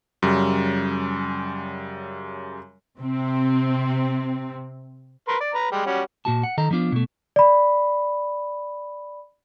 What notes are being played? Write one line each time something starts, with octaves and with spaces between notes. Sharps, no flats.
F#2 C#3 G3
C3 C4
A#4 B4 C6
D5
B4 A#5
G3 G#3 G4
G3 C#4 F#4
A#2 F#4 A5
F#5
D#3 A4 D#5 A#5
F3 B3 D4 F4
B2 A3
D5 B5